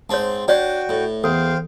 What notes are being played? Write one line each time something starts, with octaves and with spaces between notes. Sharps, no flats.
G#2 C4 C#5 A5
D4 F#4 C#5 D5 F#5 G5
A2
E2 A4 C5 F5 G5